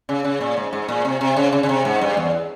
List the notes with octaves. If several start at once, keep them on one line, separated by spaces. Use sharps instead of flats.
C#3
C#3
A#2
G#2
G#2
A#2
C3
C3
C#3
C#3
C#3
C3
G#2
G2
E2